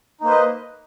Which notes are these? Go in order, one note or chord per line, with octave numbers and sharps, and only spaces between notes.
A#3 D#4 B4 C5 D#5